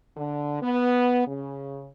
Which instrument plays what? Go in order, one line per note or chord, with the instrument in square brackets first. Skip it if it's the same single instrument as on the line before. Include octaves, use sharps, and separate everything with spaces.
[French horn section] D3
B3
C#3